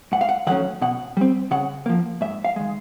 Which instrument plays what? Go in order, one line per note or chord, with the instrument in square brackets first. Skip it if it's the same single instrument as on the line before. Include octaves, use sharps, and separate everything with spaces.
[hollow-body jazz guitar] G#2 F#5
F5
F#5
D#3 F#3 A3 C#4 F#5
B2 F#5
G3 C4
C#3 F#5
F3 A#3
G#2 E5
F5
D#3 G#3